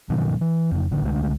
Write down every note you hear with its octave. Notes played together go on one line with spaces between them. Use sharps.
G#2 B2 D#3 F#3
E3
F2 C#3
A1 D3
C#2 D3 G#3 A3